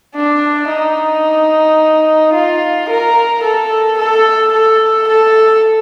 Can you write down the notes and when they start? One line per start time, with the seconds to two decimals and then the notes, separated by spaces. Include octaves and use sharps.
0.15 D4
0.70 D#4
2.34 F4
2.89 A#4
3.44 A4
3.99 A4
4.53 A4
5.08 A4